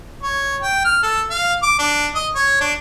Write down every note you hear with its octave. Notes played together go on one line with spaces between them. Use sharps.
C#5
G5
F6
A4
F5
D6
D4
D#5
C#5
D4